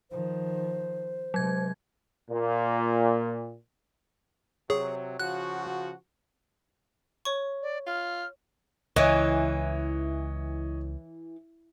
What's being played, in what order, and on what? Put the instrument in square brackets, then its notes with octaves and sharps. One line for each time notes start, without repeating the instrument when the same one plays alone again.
[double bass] D#3 F3 [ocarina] C5
[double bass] C3 G#3 [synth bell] F#3 G#6
[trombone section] A#2
[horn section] C3 F#3 [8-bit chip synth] G#4 [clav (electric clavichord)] C#5
[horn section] C#3 F3 F#4 [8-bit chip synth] F#6
[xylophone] C#5 C#6
[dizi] D5
[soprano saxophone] F4 [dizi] F6
[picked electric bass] C#2 [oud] E3 [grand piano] C#5 D#5